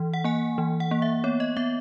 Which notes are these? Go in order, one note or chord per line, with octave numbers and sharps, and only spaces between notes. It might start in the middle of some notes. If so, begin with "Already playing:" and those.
Already playing: E3
F#5
A#3 G#5
E3
F#5
A#3
E5
B3 C#5
D#5
B3 E5